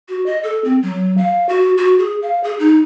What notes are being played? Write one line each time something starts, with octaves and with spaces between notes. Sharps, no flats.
F#4
D#5
A4
C4
F#3
F5
F#4
F#4
G#4
F5
G#4
D#4